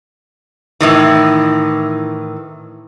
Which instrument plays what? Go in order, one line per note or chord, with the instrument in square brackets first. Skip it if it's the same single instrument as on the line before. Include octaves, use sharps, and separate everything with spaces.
[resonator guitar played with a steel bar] A2 D#3 E3